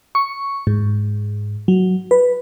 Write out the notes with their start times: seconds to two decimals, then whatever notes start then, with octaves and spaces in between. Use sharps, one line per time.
0.15 C#6
0.67 G#2
1.68 F#3
2.11 B4